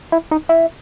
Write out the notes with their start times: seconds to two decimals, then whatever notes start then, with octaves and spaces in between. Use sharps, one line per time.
0.12 E4
0.31 D#4
0.49 E4